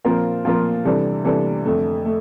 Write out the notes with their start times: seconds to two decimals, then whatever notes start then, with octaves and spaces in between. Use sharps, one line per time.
0.04 A#2 F3 C4 F4 A#4
0.45 A#2 F3 C4 F4 A#4
0.85 C3 E3 G3 D4 A4
1.24 C3 E3 G3 D4 A4
1.65 F2 D3 A3
2.05 A3